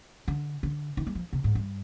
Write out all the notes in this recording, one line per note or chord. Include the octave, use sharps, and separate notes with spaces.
D3
D3
D#3
G3
F3
C3
G#2
G2